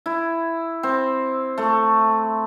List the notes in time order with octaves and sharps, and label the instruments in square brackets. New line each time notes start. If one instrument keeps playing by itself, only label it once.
[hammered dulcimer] E4
C4
A3